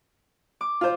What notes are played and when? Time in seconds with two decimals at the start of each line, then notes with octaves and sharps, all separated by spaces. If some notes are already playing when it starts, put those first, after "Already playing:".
0.61 D6
0.81 F4 C5